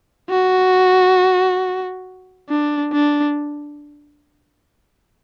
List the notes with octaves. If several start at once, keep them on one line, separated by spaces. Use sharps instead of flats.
F#4
D4
D4